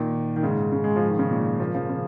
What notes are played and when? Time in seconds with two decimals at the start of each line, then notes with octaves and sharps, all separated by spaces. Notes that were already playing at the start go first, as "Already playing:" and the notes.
Already playing: A#2 D#3
0.36 D#3
0.43 G#2 C#3
0.72 G#2 C#3
0.84 G#3
0.96 F3
1.08 D#3
1.19 C#3
1.31 A#2
1.59 F3 A#3
1.74 C#3 F3
1.89 C#3